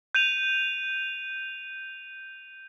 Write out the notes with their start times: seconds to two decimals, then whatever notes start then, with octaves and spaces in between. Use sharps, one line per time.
0.15 G6 D#7 F7